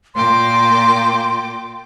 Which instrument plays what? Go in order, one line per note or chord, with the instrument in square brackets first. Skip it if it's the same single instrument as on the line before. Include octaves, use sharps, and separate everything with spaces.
[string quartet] A#2 G5 D6 [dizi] C6